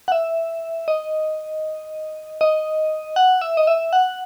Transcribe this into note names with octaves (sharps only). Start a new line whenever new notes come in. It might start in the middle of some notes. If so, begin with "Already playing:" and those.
F#5
E5
D#5
D#5
F#5
E5
D#5
E5
F#5